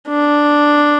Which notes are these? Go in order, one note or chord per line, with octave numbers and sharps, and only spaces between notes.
D4